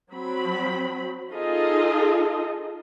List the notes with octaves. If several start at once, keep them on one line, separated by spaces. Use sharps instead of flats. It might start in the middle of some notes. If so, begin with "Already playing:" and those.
F#3 C4 B5
D#4 F4 G#4 A4 D#5